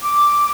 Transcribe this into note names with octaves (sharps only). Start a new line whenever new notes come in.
D6